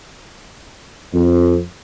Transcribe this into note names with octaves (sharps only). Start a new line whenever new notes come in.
F2